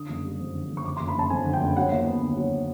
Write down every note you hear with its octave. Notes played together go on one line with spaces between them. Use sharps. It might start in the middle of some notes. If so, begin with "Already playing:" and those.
Already playing: D3 D#6
F#1
G3
F2
D3
F#1
C#6
D3 D6
C6
F#1
B5
F#1 A5
F2 G#5
D3
G5
F#1
F#3 F#5
D#2
B3
D3
F#3